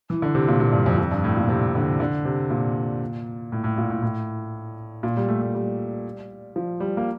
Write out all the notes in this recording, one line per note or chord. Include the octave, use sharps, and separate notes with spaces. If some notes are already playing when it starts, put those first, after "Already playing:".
E3
D3
C3
A#2
A#2
G2
F2
F2
G2
A2
A#2
C3
D3
D3
C3
A#2
A2
A2
A#2
A2
A2
A#2
G3
A3
A3
G3
F3
G3
A#3